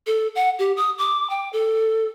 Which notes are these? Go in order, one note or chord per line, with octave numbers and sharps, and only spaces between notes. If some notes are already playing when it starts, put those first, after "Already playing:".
A4
F#5
G4
D#6
D6
G5
A4